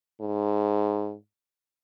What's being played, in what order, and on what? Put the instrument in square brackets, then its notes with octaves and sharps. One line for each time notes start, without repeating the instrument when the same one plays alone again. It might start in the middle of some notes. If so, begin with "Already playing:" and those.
[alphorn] G#2